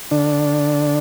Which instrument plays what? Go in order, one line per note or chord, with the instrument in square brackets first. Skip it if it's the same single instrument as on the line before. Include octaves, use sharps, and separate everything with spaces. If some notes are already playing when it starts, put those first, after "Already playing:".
[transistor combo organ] D3 D4